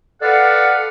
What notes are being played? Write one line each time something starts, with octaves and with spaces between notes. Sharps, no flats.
A4 B4 D5 F5 F#5